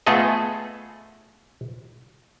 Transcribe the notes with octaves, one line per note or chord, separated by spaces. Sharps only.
A3 B3 F4 G#4 A4 D#5